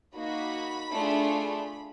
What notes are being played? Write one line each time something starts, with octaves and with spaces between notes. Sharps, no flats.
A#3 D#4 F#4 B5
A3 D4 F4 G#4